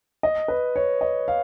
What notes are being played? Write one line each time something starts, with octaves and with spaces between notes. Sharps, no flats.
D#5
B4
C#5
D#5
F5